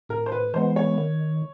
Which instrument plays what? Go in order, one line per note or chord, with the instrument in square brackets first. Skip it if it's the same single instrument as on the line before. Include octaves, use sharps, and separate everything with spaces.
[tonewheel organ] A2 [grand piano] A#4
[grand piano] C5
B4
[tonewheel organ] E3 G#3 B3 [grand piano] C5
[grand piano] C#5
[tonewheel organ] D#3